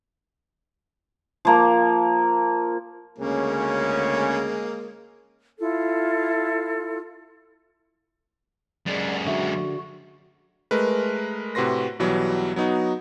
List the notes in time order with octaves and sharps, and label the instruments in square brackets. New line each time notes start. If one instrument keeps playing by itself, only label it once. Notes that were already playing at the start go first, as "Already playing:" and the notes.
[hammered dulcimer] F3 A#3
[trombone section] D2 C#3 C#4 [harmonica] G#3 A#3
[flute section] E4 F4 A4
[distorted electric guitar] F#2 G#3 [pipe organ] D5
[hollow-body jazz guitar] D3 E5 [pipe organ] F#4
[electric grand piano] G#3 A3 A#4 B4
A2 C3 F#4 B4 C6 A#6
B1 B2 E3 F#3 G3
F#3 B3 D#4 F#4